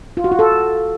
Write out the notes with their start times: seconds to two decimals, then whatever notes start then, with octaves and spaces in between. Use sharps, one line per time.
0.17 F4
0.24 F#4
0.32 F4
0.39 A4